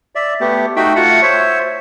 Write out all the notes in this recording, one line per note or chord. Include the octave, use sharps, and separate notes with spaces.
D5 E5
A3 B3 G4
A3 D#4 F#4 E5 G5
A3 F4 F#4 F#5
C5 C#5 E5